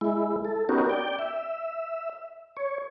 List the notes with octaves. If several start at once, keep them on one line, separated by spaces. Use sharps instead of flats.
G#3 E4
A4
B3 C#4 D#4 F#4 G4 A#4
D5 G5
E5
C#5